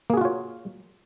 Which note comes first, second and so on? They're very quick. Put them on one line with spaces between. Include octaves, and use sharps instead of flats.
A#3 G#4 F#4 F4 C#5